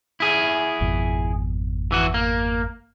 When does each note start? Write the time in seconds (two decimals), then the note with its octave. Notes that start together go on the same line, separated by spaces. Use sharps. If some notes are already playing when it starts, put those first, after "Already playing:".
0.20 E4 G#4
0.81 G#1 F2 B2
1.92 E3 F#4
2.14 A#3